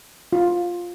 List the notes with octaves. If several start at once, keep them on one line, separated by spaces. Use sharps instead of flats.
F4